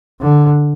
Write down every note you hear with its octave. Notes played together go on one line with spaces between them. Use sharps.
D3